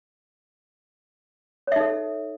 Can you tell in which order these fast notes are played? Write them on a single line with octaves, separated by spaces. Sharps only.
C#5 E5 D#4 A4